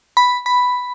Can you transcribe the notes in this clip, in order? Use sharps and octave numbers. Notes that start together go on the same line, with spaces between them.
B5
B5